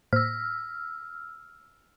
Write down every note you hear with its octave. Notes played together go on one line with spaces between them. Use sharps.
A2 A#3 C5 E6 F6